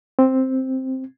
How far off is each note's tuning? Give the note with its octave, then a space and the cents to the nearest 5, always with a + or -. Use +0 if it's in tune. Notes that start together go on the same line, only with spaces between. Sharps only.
C4 +5